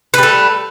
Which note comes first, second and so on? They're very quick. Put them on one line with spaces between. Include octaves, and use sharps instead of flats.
B4 G3 A3